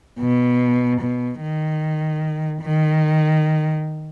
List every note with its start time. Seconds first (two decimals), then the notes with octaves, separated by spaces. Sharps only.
0.20 B2
1.01 B2
1.41 D#3
2.62 D#3